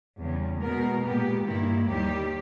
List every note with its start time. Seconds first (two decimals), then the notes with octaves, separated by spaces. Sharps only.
0.19 E2 C#3 G3
0.61 B2 G#3 B3 A#4
1.03 A#2 G#3 B3 G4
1.45 G2 D#3 A#3 E4
1.87 D#2 D#3 G3 G4